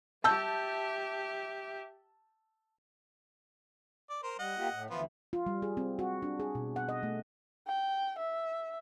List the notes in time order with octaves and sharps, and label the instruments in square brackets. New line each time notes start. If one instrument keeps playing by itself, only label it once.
[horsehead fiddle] G4 E5 [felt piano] A5 E6 G6
[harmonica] D5
A#4 C5
[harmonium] G3 [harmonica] D#5 F#5
[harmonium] A#3 F4 G4
A2
[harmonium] D2 E3 [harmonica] F3 B3 F4
[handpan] F4
G3
G#4
C4
F#4
D4
G#4
B2
F#5
D#5
A3
[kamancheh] G5
E5